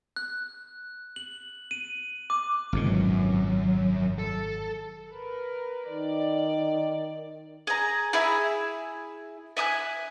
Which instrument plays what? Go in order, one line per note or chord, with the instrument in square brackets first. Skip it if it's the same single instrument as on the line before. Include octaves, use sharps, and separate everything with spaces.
[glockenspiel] F#6
F#7
D#7
D6
[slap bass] G#1 F2 B2
[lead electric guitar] C#2 F#2
A4
[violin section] A#4 B4
[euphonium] D#3 [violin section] D5
[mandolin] G#4 A#5
E4 G#4 E5
E5 G#5 D#6 F#6